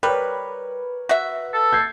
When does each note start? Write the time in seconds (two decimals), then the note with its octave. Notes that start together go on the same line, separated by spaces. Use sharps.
0.03 G3 A#4 B4 C#5
1.09 F#4 E5
1.54 A4
1.73 G6 G#6 C7